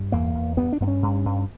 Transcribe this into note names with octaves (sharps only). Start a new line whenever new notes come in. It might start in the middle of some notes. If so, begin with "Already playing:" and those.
Already playing: G2
E2 A#3
E2
G2 B3
D4
G2 B3
C#4
G2
G2